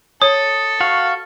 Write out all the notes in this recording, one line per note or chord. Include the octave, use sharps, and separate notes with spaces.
A4 C#5 D#6
F#4 F5 C#6